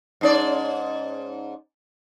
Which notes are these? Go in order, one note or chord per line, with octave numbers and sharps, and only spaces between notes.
G#2 C#4 D5